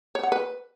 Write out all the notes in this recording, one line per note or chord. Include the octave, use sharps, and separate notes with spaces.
C#5
F#5
B4